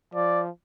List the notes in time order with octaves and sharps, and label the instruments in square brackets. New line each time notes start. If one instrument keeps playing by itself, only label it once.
[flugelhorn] F3 [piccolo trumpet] D5